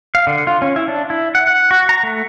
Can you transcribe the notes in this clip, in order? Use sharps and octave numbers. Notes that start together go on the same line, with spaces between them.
F5
D3
F4
C#4
E4
D4
E4
F#5
F#5
F#4
A#5
A3